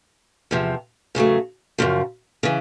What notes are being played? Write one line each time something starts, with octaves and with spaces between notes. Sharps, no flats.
E2 C3 F3
E2 C#3 F#3 A3
F#2 C#3 F3
C#3 E3